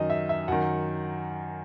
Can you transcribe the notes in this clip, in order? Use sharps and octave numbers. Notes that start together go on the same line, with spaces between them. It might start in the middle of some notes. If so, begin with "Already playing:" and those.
Already playing: F#2 D#3 D#5
E5
E5
F#2 D#3 F#5